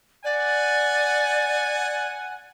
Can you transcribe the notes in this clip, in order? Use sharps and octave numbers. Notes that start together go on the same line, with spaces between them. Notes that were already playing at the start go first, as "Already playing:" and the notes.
D5 F#5 G#5